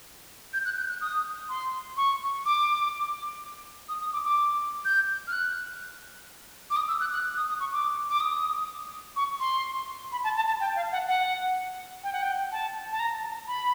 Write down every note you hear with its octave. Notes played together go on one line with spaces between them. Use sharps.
G6
F#6
G6
F#6
D#6
C6
C#6
D6
D#6
D#6
D6
D6
G6
F6
F#6
D6
D#6
E6
F#6
F#6
D#6
D#6
C#6
D6
D6
D#6
C#6
C6
B5
A5
A5
A5
G5
F5
F#5
F#5
G5
F#5
G5
A5
A5
A#5
B5